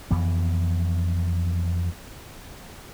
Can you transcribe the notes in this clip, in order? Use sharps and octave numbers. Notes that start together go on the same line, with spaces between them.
F2 E3 B3